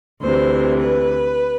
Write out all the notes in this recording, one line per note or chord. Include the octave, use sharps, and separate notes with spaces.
D2 C3 E3 C5
B4